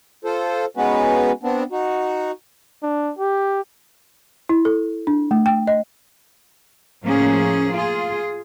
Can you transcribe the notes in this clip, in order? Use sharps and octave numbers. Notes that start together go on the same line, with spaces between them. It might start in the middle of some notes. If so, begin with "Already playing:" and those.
F4 A4 C5
G#3 B3 C#4 D#4 F#4 B4
B3 C4 D4
D#4 F#4
D4
G4
E4
A4
D4
A3
G5
D#5
A2 F3 A#3 C#4 G#4
F4 G#4